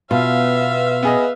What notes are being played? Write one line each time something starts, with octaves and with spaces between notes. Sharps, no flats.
B2 F4 B4 E5 F5
B3 G#4 D#5